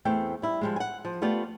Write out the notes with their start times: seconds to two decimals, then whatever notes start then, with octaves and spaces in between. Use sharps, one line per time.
0.05 E2 A3 C4 G5
0.42 G3 E4
0.61 F3 G3 G#3
0.76 F#5 G#5
1.05 F3
1.22 A3 B3 F4 G4 D5